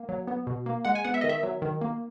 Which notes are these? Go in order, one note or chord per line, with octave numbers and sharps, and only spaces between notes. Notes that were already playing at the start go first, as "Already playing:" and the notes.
Already playing: A#3
F#3
B3
B2
A#3
G#3 F#5
G#5
B3 F#5
E5
D#3 D#5
E5
F#3
D#3
A#3